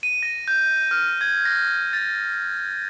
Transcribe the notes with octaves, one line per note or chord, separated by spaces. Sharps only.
D#7
A#6
G6
F6
G#6
A#6
A6